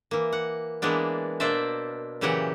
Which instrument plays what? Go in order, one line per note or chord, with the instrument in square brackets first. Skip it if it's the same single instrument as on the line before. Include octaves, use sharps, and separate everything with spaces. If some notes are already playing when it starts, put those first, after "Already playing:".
[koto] E3 A#3
F#5
E3 G#3 A#3 B3 D4
B2 A#3 D4 C5 D5 E5
A#2 C#3 E3 F#3 G4 F#5